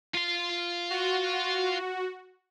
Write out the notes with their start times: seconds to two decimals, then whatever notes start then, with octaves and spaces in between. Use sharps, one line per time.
0.14 F4 C6
0.90 F#4